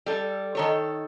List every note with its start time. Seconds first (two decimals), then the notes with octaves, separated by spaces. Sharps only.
0.06 G3 A4
0.55 D#3 A4 C#5